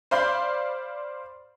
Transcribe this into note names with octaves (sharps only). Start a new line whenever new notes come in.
C5 D5 F5 B5 C6 G6